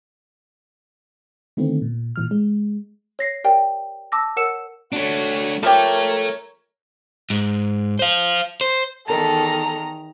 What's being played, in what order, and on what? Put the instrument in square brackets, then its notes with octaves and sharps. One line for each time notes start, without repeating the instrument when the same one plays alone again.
[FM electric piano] D3 D#3 A3 B3 C4
A#2
A#2 E3 F6
G#3
[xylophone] C#5 A#6 C7
G4 A#4 C#5 D5 G5 A5
A5 D6 E6 A#6
A#4 C#5 F#5 E6 C#7 E7
[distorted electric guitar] A3 D4 [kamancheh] F#4 C#5
[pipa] F3 G4 [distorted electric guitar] A4 E5 [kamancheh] A#4 C#5
[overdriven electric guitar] G#2
C5 F5
C5
[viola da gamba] E2 D#3 [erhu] A4 [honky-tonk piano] A#4 A5 [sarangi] A#5